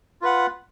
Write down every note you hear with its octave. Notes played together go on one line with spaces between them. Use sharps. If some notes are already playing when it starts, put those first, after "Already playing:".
F4 B4 F#5